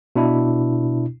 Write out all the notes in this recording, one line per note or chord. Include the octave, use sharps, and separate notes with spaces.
B2 D4 E4